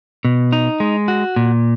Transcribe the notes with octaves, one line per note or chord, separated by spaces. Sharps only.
B2
D#4
G#3
F#4
A#2